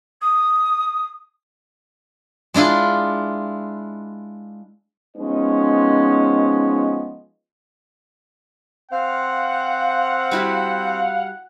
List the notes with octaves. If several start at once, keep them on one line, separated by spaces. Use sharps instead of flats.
D#6
G#3 D4 E4 F4
F3 G#3 B3 C#4 D#4 D#5
C4 C5 F5 F#5
G3 E4 F#4